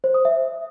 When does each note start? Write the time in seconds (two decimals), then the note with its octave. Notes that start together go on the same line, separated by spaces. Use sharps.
0.04 C5
0.14 D#6
0.25 E5